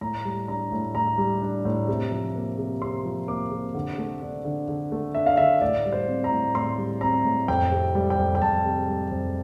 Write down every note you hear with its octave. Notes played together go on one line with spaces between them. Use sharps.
A2 A#5
G3
D4 A#5
A2
A2 A#5
G3
D4
A2
C3
F3
A#3
C3
C3 C6
F3
A#3 D6
C3
D3
A3
D4
D3
D3
A3
D4 E5
F5
D3 E5
A2 D5
G3
C5
C4
A#5
A2
A2 C6
G3
C4 A#5
A2
F2 G5
C3
G3
G5
F2
G5
F2 A5
C3
G3
F2